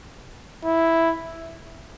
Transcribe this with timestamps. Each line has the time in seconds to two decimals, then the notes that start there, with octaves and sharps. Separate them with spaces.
0.65 E4